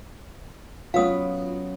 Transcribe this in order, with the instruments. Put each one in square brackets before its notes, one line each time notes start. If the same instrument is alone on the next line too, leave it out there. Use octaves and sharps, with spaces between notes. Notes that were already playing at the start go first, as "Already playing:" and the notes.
[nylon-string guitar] F#3 B3 C#4 [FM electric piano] F4 [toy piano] F5 D#6